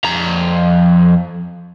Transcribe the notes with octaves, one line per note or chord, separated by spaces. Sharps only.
F2 A#5